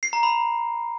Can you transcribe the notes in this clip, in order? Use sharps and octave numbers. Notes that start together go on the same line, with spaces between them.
C7
A#5
B5